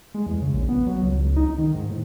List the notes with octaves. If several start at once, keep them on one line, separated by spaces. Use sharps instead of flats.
G#3
E2
C#3
A#1
B3
F#3
C#2
C#2
D#4
D#3
G#2
A2